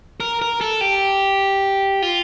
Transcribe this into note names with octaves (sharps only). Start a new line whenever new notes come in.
A#4
A#4
A4
G4
F4